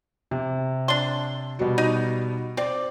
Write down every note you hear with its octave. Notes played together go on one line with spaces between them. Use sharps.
C3
D4 C6
B2 G3 F#4
D#4
C4 D5 D6